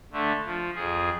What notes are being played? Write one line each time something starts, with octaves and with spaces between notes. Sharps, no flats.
D3 A3
F3
F2 G#4